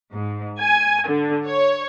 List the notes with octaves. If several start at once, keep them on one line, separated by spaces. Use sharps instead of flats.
G#2
G#5
D3
C#5